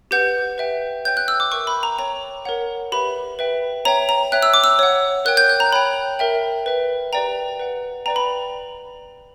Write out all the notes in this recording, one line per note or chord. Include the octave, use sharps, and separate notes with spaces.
G4 B4 F#5 G6
B4 E5 G5
C#5 G5 G6
F#6
E6
D6
A#4 E5 G5 C#6
B5
A#5
C#5 G5 A#5
A#4 C#5 F#5
G4 B4 E5 B5
B4 E5 G5
C#5 E5 G5 A#5
A#5
C#5 E5 G5 F#6
E6
D6
E6
C#5 F#5
A#4 C#5 G5 F#6
G6
F#6
A#5
C#5 G5 B5
A#4 E5 G5
B4 E5 G5
G4 B4 D5 G5 A#5
B4 F#5
B4 D5 G5 A#5
B5